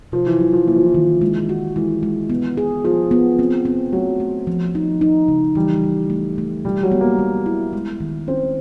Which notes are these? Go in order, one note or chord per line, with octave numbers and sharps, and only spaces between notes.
C3 F3
E3
E3 F#3
F3
E3 A#3
F3
E3
D#3
G#3
F#4
E3 G#3
G#3
B3
G#4
F3 G#4
B3
C4
C4
F#3 A3
A3
F3
D#4
D#4
C#3
E3 G3
E3
A3
A3
B2 G3
F#3
B3
A#3
G3
E4
G#3
D#3
C4 C#4